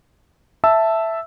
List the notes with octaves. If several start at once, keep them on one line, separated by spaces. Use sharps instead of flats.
E5 A5 E6